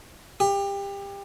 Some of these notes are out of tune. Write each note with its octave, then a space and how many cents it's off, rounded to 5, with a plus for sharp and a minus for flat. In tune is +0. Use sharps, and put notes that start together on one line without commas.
G4 +25